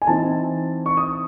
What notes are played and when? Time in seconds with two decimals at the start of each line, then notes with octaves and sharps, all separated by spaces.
0.02 G#5
0.07 E3 C4 D#4 A5
0.86 C#6
0.97 D#6